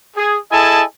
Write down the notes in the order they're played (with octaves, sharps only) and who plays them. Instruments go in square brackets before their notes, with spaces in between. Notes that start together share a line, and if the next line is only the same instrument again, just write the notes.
[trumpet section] G#4
E4 G#4 A4 D#5 G#5 A5